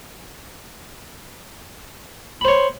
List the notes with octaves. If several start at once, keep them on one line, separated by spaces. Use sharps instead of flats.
C5 C#5 B5